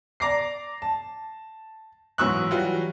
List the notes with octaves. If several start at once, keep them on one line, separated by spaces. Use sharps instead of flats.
D5 A#5 D6 A#6 C7
A5
G#2 E3 F#3 C#6 E6 F#6
E3 F#3 G3 F4 F#4